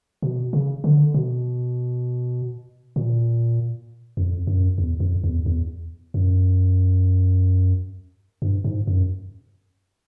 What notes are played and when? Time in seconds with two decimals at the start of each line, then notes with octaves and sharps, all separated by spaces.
0.22 B2
0.53 C#3
0.84 D3
1.14 B2
2.96 A#2
4.17 F2
4.47 F#2
4.78 E2
5.00 F2
5.24 E2
5.46 E2
6.14 F#2
8.42 G2
8.64 G#2
8.87 F#2